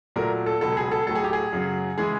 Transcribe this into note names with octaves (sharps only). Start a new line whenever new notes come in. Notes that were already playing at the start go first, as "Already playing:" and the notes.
A#2 F#3 A3 A#4
A4
C#2 B2 F#3 A4
G#4
A4
A2 F#3 A3 A4
G#4
G4
G#4
F#2 C#3 F#3
C#3 E3 G#3 G#4